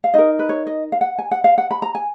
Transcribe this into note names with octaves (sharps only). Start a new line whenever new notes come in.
F5
D#4 A#4 D#5
B4
C#5
D#5
F5
F#5
G#5
F#5
F5
F#5
B5
A#5
G#5